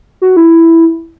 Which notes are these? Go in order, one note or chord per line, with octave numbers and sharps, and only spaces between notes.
F#4
E4